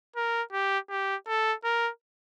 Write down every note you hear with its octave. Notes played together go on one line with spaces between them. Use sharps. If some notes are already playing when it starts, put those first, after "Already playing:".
A#4
G4
G4
A4
A#4